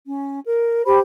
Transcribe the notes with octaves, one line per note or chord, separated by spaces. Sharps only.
C#4
A#4
G4 C5 B5